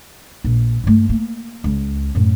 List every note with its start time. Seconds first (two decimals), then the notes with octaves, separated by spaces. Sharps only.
0.44 A#1
0.84 G2 A3
1.09 A#3
1.64 C#2
2.15 F#2 A2